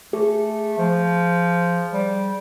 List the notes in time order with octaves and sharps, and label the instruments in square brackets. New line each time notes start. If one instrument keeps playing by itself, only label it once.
[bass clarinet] A3 [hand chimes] G#4
[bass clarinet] F3
G3